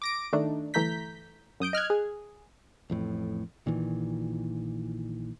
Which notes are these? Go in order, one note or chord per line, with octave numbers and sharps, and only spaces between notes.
D6 A#6 D7
D#3 A3 D4 D#4
G1 E3 A3 A#5 G6 B6
F#2 D#6 G6 D7
D#5 F6 F#6 G#6
G#4
A1 F2 A2
A#1 A#2 D#3 E3